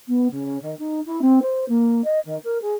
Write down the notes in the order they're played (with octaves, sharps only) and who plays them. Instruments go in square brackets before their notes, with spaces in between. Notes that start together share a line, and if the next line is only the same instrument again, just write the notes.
[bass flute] B3
C#3
D#3
D#4
E4
C4
C5
A#3
D#5
D#3
A#4
G#4